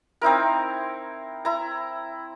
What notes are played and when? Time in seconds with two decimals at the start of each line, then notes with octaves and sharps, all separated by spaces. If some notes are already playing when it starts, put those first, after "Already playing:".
0.22 C4 D#4 E4 A#4
1.45 E4 A#5